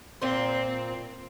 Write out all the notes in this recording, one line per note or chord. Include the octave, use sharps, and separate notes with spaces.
A#2 C4 C5